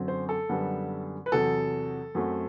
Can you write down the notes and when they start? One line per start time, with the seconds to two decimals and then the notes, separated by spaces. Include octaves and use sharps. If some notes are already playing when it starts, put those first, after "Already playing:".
Already playing: F#2 D3 F#3 C4
0.08 C5
0.29 A4
0.49 F#2 D3 G3 B3
1.26 B4
1.32 E2 C3 F#3 A4
2.15 F#2 F#3 A3 C4